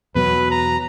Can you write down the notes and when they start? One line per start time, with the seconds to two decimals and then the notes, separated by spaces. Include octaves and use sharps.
0.15 E2 B2 F#3 B4
0.51 A#5